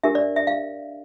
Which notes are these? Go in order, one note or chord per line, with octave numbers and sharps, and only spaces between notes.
D4 G4 A#4 E5
D5
E5
F5